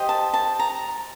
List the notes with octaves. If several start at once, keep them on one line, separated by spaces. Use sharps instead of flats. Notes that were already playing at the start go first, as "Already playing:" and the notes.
Already playing: G4 C5 D#5
A5
A5
A#5